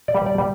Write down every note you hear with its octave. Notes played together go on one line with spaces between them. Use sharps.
D5
G3
D5
G3